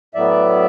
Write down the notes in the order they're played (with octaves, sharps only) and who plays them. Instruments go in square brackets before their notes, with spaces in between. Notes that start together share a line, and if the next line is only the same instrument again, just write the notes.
[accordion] A2 F#3 B3 D5 E5